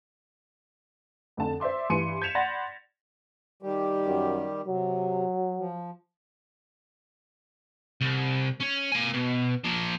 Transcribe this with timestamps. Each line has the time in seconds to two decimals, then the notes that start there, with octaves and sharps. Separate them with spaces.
1.37 F2 D3 A5
1.60 C5 D5 E5 C6 D6
1.90 G2 E3 C6 C#7 D#7
2.22 G6 G#6 B6 C#7 E7 F7
2.35 D5 F#5 B5 C6 A6 A#6
3.63 D#3 G3 G4
4.07 F#2
4.67 C3 F#3
5.58 F3
8.01 C2
8.61 C#4 C#5
8.92 A#3 G#5
9.14 B2
9.64 F3 A#3